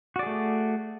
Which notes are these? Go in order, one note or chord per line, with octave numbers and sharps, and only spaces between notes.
A3 F#4 G#4 D5